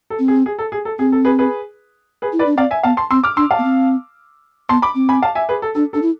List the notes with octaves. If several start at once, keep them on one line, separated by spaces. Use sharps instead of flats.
A4
C4
G#4
G#4
A4
G#4
A4
C4 G#4
A4
G#4 B4
G#4 B4
G#4 B4
E4
B4 D5
D4
C4 D5 F5
E5 G#5
B3 F5 A5
A5 C6
C4 C6 E6
D6 F6
D4 C6 E6
F5 A5
B3
C4
B3 A5 C6
B5 D6
C4
G#5 B5
F5 A5
E5 G#5
G#4 B4
A4
D4 A4
D4 A4
E4